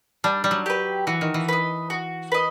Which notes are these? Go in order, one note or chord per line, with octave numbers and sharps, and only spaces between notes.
G3 D4
G3
F#3
G4 B4
E3 F#4
D#3
E3
B4 D#5
F#4
B4 D#5